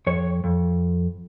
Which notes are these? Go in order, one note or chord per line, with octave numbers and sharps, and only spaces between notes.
F2 C#5
F2